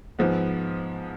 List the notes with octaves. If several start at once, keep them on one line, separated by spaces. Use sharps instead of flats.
G#2 F3 G#3 B3